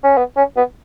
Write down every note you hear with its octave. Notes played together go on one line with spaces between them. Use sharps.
C#4
B3
C#4
B3